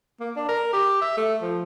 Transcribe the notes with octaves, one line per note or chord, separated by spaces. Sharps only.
A#3
D4
A#4
G4
E5
A3
F3